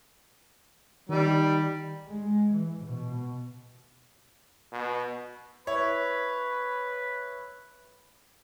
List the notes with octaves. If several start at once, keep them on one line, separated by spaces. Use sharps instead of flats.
D#3 G3 D#4
G#3
E3
B2
B2
E4 B4 C#5